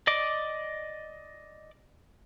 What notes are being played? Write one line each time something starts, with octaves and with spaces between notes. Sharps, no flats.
D5 D#5 D6